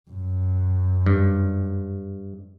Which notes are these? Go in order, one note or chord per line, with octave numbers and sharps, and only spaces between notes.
F#2
G2